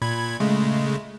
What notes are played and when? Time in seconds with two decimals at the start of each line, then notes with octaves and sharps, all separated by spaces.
0.02 A#2 B5 G#6
0.40 C#3 G#3 A3